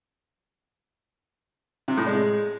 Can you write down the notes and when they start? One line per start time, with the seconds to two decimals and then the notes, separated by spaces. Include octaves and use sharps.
1.88 C3
1.97 A2
2.07 G#3